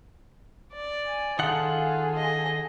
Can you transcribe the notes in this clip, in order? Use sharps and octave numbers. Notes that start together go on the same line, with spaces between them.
D5
G#5
D#3 D#4 F4 G#4 A4 F5 F#5 A5
D#5